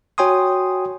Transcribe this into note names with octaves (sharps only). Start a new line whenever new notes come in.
F#4 C#5 G5 G#5 C6 D#6